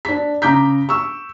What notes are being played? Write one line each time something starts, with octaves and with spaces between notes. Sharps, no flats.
D4 B6
C#3 A#5 D6 G6 B6
C#6 E6